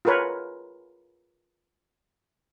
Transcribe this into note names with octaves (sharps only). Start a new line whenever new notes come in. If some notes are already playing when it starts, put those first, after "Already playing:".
F4 G#4 A#4 B4 C#5